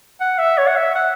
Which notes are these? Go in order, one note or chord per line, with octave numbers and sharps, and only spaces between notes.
F#5
E5
C#5
F#5
E5
F#5